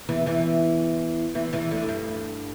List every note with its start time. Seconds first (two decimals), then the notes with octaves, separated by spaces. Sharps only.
0.09 E2 E3
0.26 E2 E3
1.35 E2 E3
1.53 E2 E3
1.71 D2 D3
1.89 G2